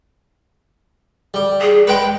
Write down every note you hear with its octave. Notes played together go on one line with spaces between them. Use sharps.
G3
G#4
G#3 B4 G5